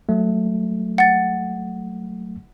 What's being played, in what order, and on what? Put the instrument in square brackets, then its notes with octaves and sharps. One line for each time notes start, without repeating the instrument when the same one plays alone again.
[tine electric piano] F#3 A3
[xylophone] F#5 A6